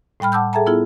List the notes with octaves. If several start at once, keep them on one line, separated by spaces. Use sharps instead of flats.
A2 G3 G5 B5 F6
F#5 A5 D6 E6 G6
G#4 A4 E5 G5 A5 A#5
B3 E4 F4 G#4